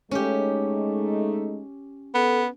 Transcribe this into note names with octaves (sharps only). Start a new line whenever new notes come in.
G#3 A3 C#4 D#4 G4
B3 A4